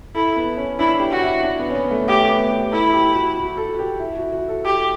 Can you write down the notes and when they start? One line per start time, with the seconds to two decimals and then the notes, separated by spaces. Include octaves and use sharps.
0.15 E4 A4
0.36 B3
0.57 C#4
0.79 D4 E4
1.00 G4
1.11 F#4
1.22 E4
1.43 D4
1.59 B3
1.70 C#4
1.75 B3
1.91 A3
2.08 A3 G4
2.29 B3
2.50 G4
2.72 E4 A4
2.94 G4
3.14 F#4
3.36 F#4
3.57 A4
3.74 F#4
3.79 G4
4.00 E4
4.17 F#4
4.32 F#4
4.48 A4
4.64 G4 A4